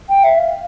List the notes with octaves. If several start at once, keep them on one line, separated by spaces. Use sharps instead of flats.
G5
E5
F5